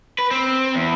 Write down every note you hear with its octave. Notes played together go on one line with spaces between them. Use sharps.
B4
C4
E2